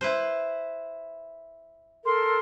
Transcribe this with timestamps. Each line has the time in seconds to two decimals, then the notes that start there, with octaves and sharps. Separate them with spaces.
0.01 E4 B4 C5
2.04 A4 A#4 C6